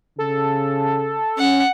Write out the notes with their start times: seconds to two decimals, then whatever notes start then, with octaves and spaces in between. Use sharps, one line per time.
0.18 C#3 A4
1.38 C#4 F#5